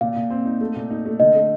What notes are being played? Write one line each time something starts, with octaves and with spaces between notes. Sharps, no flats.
A#2 F5
A#2
C4
D#4
A3
A#2
D#4
A3
D3 D#5
A3